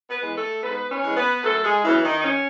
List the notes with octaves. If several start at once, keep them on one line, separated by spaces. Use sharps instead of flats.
B3 B4
E3 G#3 B3
A3 A4
G#2 B3 B4
C#4 C#5
E3 G#3 B3
B3 B4
F#2 A3 A4
G#3 G#4
C#3 E3 F#3 B3 E4
D#3 D#4
D#4
C#4